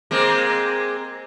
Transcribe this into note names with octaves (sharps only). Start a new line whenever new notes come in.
G#3 A#3 C4